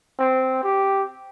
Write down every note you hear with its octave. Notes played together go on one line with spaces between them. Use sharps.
C4
G4